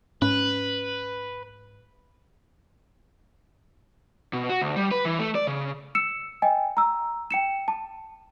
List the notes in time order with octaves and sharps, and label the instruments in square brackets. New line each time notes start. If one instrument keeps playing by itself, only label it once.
[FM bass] G#2 [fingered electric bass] C#4 [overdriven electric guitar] B4
[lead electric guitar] B2
F#4
D2
G3
B4
E3
A3
D5
C#3
[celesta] E6 C#7 E7
D#5 G5 G#5
A#5 E6
G5 C#7 E7
A5